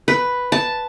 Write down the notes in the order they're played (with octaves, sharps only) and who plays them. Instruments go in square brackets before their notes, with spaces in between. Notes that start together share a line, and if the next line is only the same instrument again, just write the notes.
[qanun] B4
A5